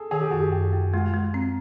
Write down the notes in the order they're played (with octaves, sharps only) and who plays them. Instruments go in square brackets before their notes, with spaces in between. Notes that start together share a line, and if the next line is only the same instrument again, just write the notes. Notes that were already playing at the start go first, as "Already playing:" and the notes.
Already playing: [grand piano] G#4 A4
[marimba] D#3 [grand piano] G#4
[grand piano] G4
[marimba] F#2 [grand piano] F#4
[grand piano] G4
[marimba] F#2
F#2
[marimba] G#3 [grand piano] F4
[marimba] G#3
C4